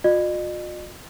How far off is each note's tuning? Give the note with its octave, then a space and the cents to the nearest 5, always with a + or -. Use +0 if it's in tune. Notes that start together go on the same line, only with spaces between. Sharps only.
F4 +40 D#5 -45